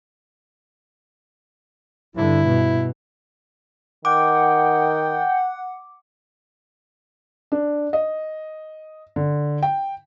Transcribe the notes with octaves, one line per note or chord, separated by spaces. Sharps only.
G2 D3 E4
B2
D#3 F#5 G5 D6
D4
D#5
D3
G5